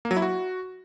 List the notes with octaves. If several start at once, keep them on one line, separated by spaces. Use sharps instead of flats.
A#3
F#3
E4
F#4